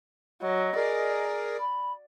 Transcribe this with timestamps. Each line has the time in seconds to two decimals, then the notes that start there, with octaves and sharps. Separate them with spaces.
0.42 F#3 D#5
0.76 G#4 A#4 D5
1.60 B5